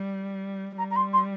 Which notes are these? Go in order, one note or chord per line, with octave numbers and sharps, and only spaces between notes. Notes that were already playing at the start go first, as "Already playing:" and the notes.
Already playing: G3
G3 A#5
A#5
C6
C6